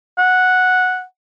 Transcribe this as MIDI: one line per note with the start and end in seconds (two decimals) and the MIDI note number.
0.19 1.03 78